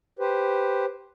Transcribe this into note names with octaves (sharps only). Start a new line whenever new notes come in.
G4 B4 C5